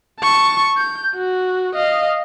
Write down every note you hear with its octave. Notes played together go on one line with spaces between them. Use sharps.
A5 C#6
G6
F#4
D#5 F5